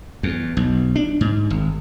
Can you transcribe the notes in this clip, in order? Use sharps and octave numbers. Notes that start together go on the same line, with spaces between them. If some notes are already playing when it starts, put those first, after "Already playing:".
E2
B1
D4
G#2
G#1